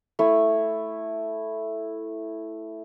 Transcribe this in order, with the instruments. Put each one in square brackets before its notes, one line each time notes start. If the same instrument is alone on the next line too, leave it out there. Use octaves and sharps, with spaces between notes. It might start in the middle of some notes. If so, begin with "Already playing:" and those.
[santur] A3 E4